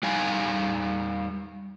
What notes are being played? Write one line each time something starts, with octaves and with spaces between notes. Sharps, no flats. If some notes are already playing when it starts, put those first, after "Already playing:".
G3 D#4 F5 G#5